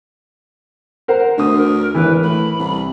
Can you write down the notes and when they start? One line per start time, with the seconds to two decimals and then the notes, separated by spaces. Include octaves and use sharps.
1.08 A#4 C5 F#5
1.38 D2 D3 D#6
1.55 A#4
1.95 G#1 E3 B4
2.22 A2 B5
2.59 C2